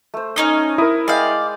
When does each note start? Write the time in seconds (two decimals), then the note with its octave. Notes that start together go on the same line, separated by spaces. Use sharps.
0.14 A3 C5
0.36 C#4 D#4 D#5
0.78 E4 A#4 D#6
1.08 G#3 D5 F5 G5